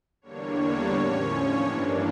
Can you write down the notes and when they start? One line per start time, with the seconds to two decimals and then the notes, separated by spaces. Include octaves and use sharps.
0.22 E2 D3 G3 A#3 D4 C#5
0.91 A2 F3 C#4
1.61 G2 E3 A#3 D4